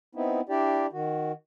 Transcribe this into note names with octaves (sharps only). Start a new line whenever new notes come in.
B3 C4 D#4 E4
D4 E4 G4 D5
D#3 F#4